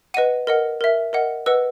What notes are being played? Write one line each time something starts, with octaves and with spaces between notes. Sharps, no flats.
B4 D#5 F#5 D#7
A#4 D#5 F#5
A#4 E5
A#4 D#5 F#5
B4 D#5 F#5 E6